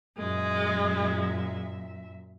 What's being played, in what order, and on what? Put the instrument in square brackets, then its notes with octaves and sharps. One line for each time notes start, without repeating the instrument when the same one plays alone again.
[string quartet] F#2 A#2 E5 [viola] G#3